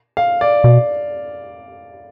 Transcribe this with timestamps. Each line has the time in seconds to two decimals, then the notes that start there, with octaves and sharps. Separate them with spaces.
0.17 F5
0.41 D5
0.64 B2